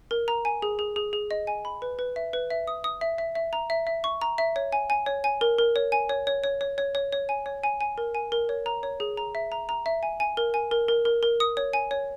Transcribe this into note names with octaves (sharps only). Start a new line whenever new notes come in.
A#4
A#5
G#5
G#4
G#4
G#4
G#4
D#5
G#5
B5
B4
B4
E5
B4
E5
D#6
D#6
E5
E5
E5
A#5
E5
E5
C#6
A#5
E5
C#5
G#5
G#5
C#5
G#5
A#4
A#4
C#5
G#5
C#5
C#5
C#5
C#5
C#5
C#5
C#5
G#5
C#5
G#5
G#5
A#4
G#5
A#4
C#5
A#5
C#5
G#4
A#5
E5
A#5
A#5
E5
G#5
G#5
A#4
G#5
A#4
A#4
A#4
A#4
D#6
C#5
G#5
C#5